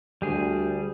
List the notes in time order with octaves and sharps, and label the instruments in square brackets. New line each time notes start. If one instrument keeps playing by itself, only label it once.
[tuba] D2 [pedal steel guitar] G3 G#4